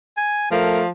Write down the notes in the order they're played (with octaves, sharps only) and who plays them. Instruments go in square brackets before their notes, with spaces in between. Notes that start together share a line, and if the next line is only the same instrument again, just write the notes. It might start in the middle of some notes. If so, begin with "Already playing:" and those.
[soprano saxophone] G#5
[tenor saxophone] F3 [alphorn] A3 [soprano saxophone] A#4